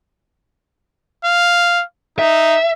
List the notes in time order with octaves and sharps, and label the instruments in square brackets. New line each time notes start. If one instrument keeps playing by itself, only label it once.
[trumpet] F5
[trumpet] D#4 [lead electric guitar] E5